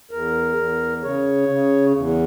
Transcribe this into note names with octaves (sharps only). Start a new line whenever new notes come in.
E2 A#4
E2
C#3 C#5
C#3
E2